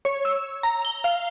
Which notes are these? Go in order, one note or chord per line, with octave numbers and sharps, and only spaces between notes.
C#5
E6
A#5
G7
F5